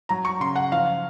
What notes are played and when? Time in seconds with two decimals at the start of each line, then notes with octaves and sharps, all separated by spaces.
0.09 F#3 A#5
0.25 C#6
0.40 C#3 C6
0.56 F#5
0.72 F3 F5